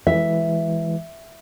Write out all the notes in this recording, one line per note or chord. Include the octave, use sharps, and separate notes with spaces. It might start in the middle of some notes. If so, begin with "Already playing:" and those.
E3 G#3 E5